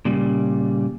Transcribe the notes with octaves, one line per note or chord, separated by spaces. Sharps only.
A#2 C#3 G3